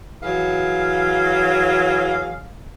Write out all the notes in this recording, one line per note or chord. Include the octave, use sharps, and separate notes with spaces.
E3 F#3 G#4 F5